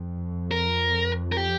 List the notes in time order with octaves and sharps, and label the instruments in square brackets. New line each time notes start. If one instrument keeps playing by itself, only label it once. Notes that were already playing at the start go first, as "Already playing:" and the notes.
Already playing: [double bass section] F2
[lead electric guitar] A#4
A#4
G4